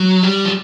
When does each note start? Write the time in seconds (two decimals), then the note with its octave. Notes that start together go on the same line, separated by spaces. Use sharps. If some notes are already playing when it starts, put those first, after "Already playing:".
Already playing: F#3
0.23 G3
0.45 F3